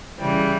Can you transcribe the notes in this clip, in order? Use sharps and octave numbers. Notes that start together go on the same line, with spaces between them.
C#3 E3 G3